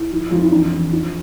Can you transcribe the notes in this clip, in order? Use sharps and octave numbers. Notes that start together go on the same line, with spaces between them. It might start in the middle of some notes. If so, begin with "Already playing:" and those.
Already playing: E4
F3
F2 F4
E4
E2 D4
E2
F3